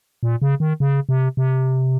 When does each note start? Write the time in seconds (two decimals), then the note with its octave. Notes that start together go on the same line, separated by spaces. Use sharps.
0.23 A#2
0.42 C#3
0.60 D#3
0.80 C#3
1.09 C3
1.37 C3